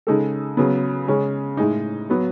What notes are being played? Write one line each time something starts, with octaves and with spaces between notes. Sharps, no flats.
C#3 G#3 D#4 A4
C#3 F#3 B3
C#3 G#3 C#4
A2 G#3 D#4
F#3 B3